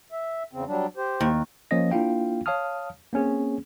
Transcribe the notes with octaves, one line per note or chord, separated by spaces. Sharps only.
E5
E2 C#3 C4
F#3 G3 D4
G4 C5
D#2
F3 A#3 C#4 C#5 D#5 A#6
A#3 D4 E4 F4 F5 G5
C#5 F5 A5 D#6 F6
A#3 C4 C#4 G#4